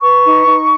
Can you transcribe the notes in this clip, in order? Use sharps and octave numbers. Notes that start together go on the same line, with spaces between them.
B4 C#6
D#4
D#4